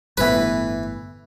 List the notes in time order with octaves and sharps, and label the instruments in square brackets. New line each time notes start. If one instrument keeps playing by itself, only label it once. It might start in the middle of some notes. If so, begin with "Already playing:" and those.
[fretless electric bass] G1 A2 B3 [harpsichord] E3 B4